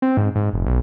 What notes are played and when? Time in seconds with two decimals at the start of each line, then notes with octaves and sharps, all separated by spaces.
0.02 C4
0.17 G#2
0.35 G#2
0.53 F1
0.66 B1